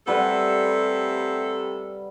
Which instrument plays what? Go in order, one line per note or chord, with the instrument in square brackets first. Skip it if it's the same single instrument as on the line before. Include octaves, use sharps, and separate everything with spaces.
[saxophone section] C3 A3 A4 [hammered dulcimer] G3 B4 F#5